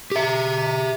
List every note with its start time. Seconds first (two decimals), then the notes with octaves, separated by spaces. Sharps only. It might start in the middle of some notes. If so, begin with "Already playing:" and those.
0.11 G4 E5